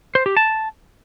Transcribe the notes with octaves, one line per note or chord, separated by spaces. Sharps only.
C5
G4
A5